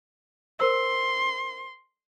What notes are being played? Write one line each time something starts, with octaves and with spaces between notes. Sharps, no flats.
A#4 C5 C6 E6